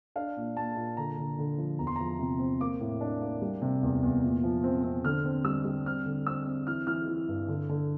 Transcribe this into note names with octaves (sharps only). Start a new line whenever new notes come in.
D4 F5
A#2
A#2 A5
A#2
D3 A#5
D3
D3
F3
E2 A#5
C6
F3 A#5
C3
C4
A#3 D6
A2
D4
A#3
G3
C3
E2
E2
A#2
F3
C4
C4
D3 F6
C4
G3 E6
G3
C4 F6
D3
C4 E6
C4
E3 F6
E3 F6
E3
G2
D3
D3